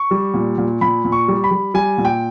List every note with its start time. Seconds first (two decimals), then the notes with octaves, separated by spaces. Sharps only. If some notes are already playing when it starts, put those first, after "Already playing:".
Already playing: C#6
0.11 G3
0.34 A#2
0.58 A#2
0.81 A#2 B5
1.04 A#2
1.12 C#6
1.28 G3
1.44 B5
1.51 G3
1.74 G3 G#5
1.98 A#2
2.05 G5